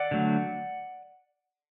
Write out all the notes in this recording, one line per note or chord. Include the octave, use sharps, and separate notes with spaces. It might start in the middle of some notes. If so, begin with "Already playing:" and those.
Already playing: D5 F#5
D3 F#3 A3